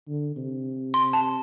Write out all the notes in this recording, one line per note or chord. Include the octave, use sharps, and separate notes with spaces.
D3
C3
C6
A5